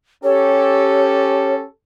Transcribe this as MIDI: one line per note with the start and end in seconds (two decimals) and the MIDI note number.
0.23 1.64 61
0.23 1.64 67
0.23 1.64 69
0.23 1.54 73